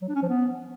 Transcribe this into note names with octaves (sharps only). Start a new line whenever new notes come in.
F#3
D4
C#4
F3
B3